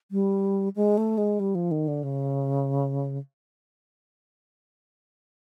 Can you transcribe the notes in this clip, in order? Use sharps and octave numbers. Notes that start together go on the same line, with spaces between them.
G3
G#3
A3
G#3
G3
F3
D#3
D3
C#3